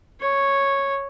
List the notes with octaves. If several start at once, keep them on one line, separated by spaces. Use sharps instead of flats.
C#5